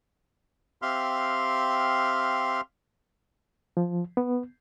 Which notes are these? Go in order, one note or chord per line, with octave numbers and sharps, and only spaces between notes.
C4 G4 E5 F5 C6 F6
F3
B3